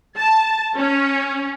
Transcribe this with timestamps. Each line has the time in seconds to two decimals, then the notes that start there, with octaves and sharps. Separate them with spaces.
0.18 A5
0.77 C#4